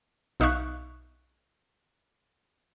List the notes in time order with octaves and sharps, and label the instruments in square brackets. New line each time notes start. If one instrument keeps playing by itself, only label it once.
[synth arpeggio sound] B1 D#4 E5 F5 C#6 F#6